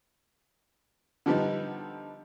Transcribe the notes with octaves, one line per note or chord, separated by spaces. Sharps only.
D3 F3 G3 B3 D#4